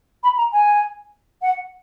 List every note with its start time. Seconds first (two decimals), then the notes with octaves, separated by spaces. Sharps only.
0.23 B5
0.37 A#5
0.53 G#5
1.42 F#5